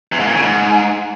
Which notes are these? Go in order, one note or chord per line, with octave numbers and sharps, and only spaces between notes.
E2
G#2
A#2
C#3
G#2